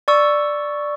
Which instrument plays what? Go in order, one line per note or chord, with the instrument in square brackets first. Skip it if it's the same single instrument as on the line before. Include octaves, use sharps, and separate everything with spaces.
[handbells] D5 C#6 E6